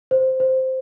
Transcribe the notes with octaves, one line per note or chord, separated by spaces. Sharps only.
C5
C5